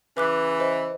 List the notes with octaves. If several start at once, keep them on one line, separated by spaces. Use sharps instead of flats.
C#3 E3 B4 D6 F#6
C5 D#5